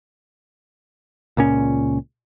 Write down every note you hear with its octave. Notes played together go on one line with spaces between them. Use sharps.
C#2 A#2 C#4